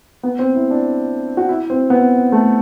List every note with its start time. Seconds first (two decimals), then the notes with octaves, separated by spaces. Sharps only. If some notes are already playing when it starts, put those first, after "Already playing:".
0.23 B3
0.39 C4
0.55 E4
0.70 D4
1.37 F#4
1.49 E4
1.70 C4
1.90 B3
2.32 A3